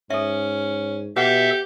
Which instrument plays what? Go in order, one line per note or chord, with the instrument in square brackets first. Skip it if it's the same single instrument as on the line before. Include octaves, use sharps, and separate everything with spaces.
[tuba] G#2 [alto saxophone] C#4 [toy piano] A4 E5
[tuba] B2 [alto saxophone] G4 [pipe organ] A4 E5 [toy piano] B4 F#5